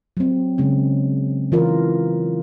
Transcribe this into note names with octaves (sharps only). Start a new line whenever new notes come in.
F#3 C4
C#3 G#3 C#4
E3 F4 A#4